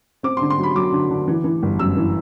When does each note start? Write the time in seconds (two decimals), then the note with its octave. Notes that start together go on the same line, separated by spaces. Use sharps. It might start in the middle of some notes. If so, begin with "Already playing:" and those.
0.23 C4 D6
0.37 C6
0.41 D3
0.50 C6
0.58 F#3
0.63 B5
0.75 F#3 D6
0.92 D3
1.10 D3
1.28 E3
1.44 E3
1.63 G1
1.79 F#2 E6
1.97 E3